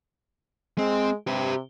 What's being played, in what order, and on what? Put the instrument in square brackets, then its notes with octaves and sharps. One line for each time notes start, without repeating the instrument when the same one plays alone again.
[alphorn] G#3 [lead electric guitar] C4
[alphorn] C3 [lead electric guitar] G4 B4